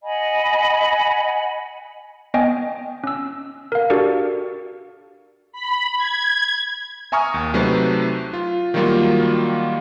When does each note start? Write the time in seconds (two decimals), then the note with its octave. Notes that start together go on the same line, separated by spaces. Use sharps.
0.03 D#5 F#5 G#5 B5
2.34 B3 D#5 G5 G#5
3.04 C#4 E6
3.72 A#4 F5
3.90 D4 F#4 G4 A4 A#4 D5
5.52 B5
5.96 G#6
7.12 E5 G#5 A#5 C#6 D#6 F6
7.34 D#2
7.54 C3 F#3 A3 D#4 B4 C5
8.33 F4
8.74 D#3 F#3 G3 A#3 F4 F#4